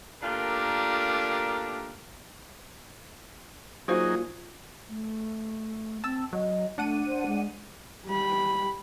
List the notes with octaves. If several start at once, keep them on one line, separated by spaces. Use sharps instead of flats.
A3 A#3 D4 F4 G4 A#4
A#2 F#3 D#4 F#4 G#4 C5 F5
A3
C4 A5 E6
F#3 D#5
A3 D4 F#5 D#7
C5
G#3
G3 B5